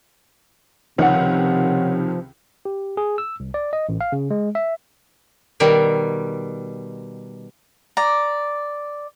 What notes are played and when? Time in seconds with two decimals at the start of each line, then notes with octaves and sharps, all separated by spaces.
0.98 C#2 C3 D#3 F3 C#5 F#5
2.65 G4
2.97 G#4
3.18 E6
3.40 C2
3.54 D5
3.73 D#5
3.89 A1
4.01 F5
4.12 C#3
4.31 G#3
4.55 E5
5.60 B2 D#3 G3
7.97 D5 A#5